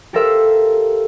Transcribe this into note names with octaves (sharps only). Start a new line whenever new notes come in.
G4 A4 A#4 C5 E5 F5